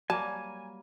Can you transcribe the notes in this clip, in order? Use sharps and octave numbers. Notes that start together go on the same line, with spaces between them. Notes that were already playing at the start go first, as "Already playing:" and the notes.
F#3 G3 A#3 G#5 A5